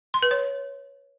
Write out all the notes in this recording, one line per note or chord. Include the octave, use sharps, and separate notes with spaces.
C6
B4
C#5